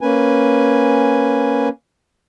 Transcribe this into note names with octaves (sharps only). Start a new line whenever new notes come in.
A#3 C#4 B4 G#5